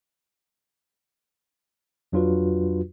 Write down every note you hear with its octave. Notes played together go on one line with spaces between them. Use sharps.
F2 F#3 D4 F4 F#4 B4